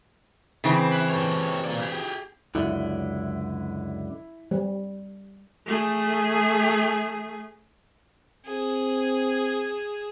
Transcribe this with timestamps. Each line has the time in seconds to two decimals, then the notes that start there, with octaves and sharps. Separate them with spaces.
0.64 C#3 E3 C4
0.92 B4 E5
1.10 G4 A4 C#5
1.65 A#3 F4 D5
1.81 G4 G#4
2.55 C#2 F#2 D3 E4
4.51 G3
5.66 A3 G#4
8.46 C4 G#4